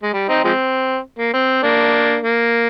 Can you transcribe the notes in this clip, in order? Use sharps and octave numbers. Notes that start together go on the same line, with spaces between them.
G#3
G3
C4 D#4
F3 G#3 C4
A#3
C4
A#3 D4
A#3